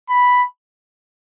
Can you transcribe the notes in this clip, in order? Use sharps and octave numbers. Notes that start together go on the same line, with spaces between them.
B5